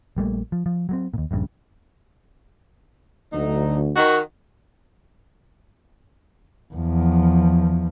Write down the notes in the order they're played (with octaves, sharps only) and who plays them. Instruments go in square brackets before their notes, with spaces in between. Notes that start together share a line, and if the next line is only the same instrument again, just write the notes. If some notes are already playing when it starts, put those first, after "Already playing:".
[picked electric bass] A#1 G3 A3 A#3
F3
F3
F#3 G#3 C4
D#2 A#2
D#1 A#1 G2 C#3
[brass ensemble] D2 [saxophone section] F#3 D#4
[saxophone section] D#3 [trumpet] F#4
[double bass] E2 F3